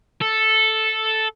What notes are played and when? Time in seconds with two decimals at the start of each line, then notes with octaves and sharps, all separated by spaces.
0.21 A4